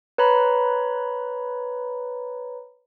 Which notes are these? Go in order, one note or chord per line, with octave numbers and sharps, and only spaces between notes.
B4 C#5 A#5 B5